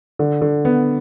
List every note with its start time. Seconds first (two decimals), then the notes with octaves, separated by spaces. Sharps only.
0.19 D3
0.42 D3
0.65 B3